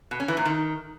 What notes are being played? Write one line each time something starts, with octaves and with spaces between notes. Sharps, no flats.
B2
C#4
E3
A#2
D#3